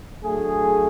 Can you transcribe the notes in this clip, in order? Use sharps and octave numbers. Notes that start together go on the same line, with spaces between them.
D3 F#3 A3 G#4